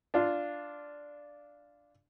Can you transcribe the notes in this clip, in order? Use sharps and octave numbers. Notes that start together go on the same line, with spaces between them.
D4 F4